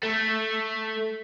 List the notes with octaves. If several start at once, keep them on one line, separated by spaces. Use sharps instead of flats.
A3